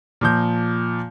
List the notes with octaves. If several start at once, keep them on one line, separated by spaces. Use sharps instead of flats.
A#2 F3 G6